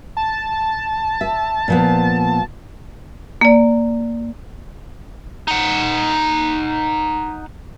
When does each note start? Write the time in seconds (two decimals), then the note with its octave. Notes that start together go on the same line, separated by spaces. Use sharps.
0.17 A5
1.21 E5
1.68 A#2 F3 B3
3.41 A#3 D5
5.48 D#4 F#5